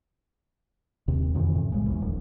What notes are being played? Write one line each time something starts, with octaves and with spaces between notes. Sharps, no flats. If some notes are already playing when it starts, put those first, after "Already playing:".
D#2 C3
F2 C3 D#3 E3
A2 C#3
B1 A2 G3 G#3
A#1 E2
D1